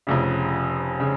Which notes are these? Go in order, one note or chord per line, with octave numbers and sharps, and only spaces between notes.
F1 F2 C#3
C#3